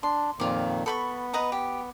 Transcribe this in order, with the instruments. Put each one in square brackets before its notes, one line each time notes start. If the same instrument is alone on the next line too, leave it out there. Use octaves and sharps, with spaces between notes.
[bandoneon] D4 [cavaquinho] C6
[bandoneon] F2 A#2 D#3 [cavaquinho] F4 D5
[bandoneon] B3 [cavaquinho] A4 B5 C#6
[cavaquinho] B4 D#5 A#5
G4